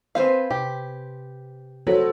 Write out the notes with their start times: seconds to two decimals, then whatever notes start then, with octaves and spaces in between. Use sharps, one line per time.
0.15 C4 B4 C5 F5 G#5
0.50 C3 G4
1.87 F#3 F#4 A4 B4 C5